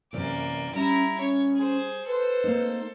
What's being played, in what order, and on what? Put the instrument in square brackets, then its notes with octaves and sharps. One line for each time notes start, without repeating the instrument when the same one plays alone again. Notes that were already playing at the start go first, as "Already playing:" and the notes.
[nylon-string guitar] F#2 C3 E3 [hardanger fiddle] A#3 D5
[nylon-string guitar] G3 [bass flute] C#4 [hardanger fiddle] E4 A#5
[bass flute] C#4 [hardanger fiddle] C#5
[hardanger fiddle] G#4 C5
[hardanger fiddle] A4 C5 [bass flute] B4
[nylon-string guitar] A#3 C4 D#4